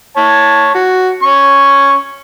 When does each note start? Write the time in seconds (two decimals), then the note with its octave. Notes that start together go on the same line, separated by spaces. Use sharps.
0.17 C#5 A5
0.75 F#4
1.23 C#4 C#6